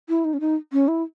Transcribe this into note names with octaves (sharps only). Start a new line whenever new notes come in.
E4
D#4
C#4
D#4
C#4
E4